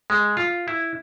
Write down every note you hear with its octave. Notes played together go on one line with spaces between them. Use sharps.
G#3
F4
E4